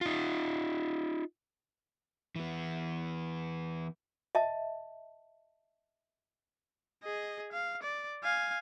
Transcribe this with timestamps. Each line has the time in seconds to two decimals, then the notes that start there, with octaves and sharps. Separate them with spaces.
0.01 D#4 F4
2.36 E3 B3
4.35 D#5 E5 A5
7.03 G#4 D#5
7.52 F5
7.83 D5
8.23 F5 G#5